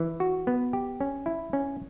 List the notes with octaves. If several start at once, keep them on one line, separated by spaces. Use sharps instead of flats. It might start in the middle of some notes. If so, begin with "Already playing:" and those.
Already playing: E3
F#4
B3
G4
C#4
E4
C#4